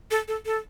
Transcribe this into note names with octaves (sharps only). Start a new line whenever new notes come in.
A4
A4
A4